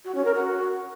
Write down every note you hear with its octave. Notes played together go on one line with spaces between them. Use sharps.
F#4
C#4
A#4
F#4